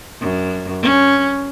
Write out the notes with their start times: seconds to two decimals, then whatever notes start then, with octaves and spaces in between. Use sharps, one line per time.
0.20 F#2
0.82 C#4